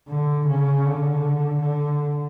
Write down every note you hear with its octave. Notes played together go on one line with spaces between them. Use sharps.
D3
C#3
D3
D3